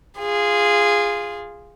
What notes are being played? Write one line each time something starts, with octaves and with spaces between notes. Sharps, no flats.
F4 G#4